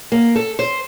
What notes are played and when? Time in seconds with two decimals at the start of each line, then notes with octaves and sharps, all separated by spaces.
0.12 A#3
0.35 A4
0.59 C5